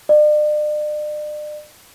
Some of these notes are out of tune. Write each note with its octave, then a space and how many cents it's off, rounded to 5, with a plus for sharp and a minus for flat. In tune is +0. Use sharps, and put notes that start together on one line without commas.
D5 +40